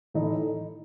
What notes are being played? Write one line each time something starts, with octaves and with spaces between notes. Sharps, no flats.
A2 E3 A3 D#4 A4